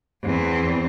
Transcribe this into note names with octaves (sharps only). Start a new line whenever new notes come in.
E2 C4